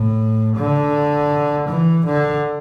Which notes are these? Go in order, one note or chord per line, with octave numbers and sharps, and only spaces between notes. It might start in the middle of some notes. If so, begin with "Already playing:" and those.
Already playing: A2
D3
E3
D3